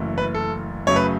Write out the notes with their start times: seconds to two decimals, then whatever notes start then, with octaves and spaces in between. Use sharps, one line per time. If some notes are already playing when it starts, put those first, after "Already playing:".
Already playing: F#1 F#2 E3 A3
0.18 B4
0.35 A4
0.87 F#2 C#3 F#3 A3 C#5
0.96 B4